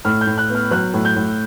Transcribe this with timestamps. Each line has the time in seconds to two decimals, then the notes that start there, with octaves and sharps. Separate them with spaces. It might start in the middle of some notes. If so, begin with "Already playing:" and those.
0.05 A2 F6
0.21 G6
0.27 A2
0.38 F#6
0.49 B3
0.55 F6
0.71 F#3 F#6
0.94 A2
1.05 G6
1.16 A2